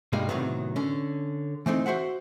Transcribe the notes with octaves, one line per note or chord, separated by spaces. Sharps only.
G2 B2 G3 G#3 A#3 D#4
A2 C3 D#3 F#3 B3
D3 C#4
E3 A3 C4 D#4
F#4 C5 E5 F#5